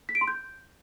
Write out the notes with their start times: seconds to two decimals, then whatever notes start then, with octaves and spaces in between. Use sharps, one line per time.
0.09 B6
0.15 D7
0.21 C6
0.28 G6